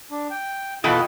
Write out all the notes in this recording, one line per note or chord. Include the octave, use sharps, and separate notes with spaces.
D4
G5
B2 E3 F4 A4 D#5 F#5 G5 B5